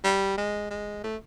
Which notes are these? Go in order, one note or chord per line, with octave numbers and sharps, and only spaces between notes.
G3
G#3
G#3
A3